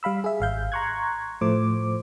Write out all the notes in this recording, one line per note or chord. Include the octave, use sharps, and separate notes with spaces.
G3 F5 B5 E6
G#4 E5
G#1 F5 G6
A#5 C6 C#6 F#6 G#6
A2 F3 A3 C5 D6